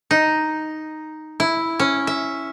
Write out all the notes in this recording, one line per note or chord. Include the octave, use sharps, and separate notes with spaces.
D#4
E4
C#4
E5